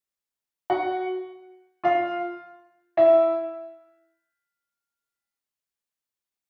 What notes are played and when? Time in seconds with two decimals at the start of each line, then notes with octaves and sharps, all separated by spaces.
0.70 F#4 F#5
1.84 F4 F5
2.97 E4 E5